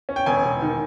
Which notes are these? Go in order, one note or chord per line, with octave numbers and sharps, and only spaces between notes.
C#4
G5
E1 G#5
E1
D#3